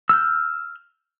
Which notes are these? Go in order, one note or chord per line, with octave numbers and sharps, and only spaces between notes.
E6 F6 G6